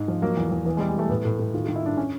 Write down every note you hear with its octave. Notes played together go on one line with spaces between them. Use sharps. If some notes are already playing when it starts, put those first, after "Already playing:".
Already playing: G#2
F3
F#3 A#3
E2
E2
E3 B3
G#3
G3
G#3
E3 A3
A2 B3
A2
A2
D#3 F4
D#3 F4
E4
G2 D4
C#4